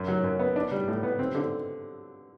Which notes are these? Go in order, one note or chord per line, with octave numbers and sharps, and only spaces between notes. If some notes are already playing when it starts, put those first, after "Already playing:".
Already playing: F#2
F#3
F#2
B3
D4
G3
A2
B3
C4
D3